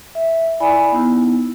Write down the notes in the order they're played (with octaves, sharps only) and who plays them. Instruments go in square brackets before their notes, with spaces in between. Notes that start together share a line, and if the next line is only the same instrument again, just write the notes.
[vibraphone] E5
E4 D5 G#5 B5
B3 D#4 E4